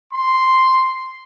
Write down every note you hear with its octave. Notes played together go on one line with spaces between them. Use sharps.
C6